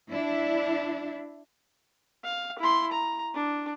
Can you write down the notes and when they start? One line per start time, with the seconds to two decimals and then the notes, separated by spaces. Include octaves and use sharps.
0.11 D4 E4
2.25 F5
2.59 E4 C6
2.92 A#5
3.35 D4